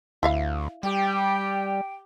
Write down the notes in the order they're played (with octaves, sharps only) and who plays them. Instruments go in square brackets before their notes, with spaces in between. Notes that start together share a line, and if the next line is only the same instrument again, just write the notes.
[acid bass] D2 [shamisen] E4 E5 F5
[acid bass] G3 [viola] G4 [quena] G5